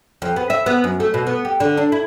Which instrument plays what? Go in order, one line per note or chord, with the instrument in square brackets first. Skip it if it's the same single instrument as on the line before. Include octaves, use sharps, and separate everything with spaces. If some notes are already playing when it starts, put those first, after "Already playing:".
[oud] F2
B3
E5
B3
F#2
A3
B2
B3
G4
D3
D4
E4